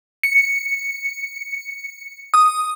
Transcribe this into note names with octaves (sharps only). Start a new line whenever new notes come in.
C#7
D#6